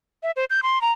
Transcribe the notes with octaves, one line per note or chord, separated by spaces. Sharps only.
E5
C5
G6
C6
A#5